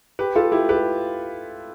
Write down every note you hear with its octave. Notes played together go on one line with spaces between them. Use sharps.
G4 B4
F4 A4
E4 G4
G4 B4